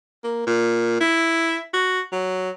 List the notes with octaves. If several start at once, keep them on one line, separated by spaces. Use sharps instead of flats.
A#3
A#2
E4
F#4
F#3